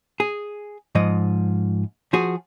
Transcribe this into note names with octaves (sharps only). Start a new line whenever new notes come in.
G#4
G#2 F3 D#5
F3 F#4 G#4